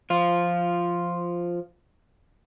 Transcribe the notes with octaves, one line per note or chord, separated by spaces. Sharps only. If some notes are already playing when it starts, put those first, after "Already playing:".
F3 F4